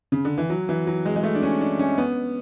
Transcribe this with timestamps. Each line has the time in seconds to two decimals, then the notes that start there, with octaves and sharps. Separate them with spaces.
0.12 C#3
0.25 D3
0.38 E3
0.50 F#3
0.69 E3
0.87 F#3
1.06 G#3
1.16 G#3
1.23 A3
1.35 D4
1.43 C#4
1.61 D4
1.79 C#4
1.98 B3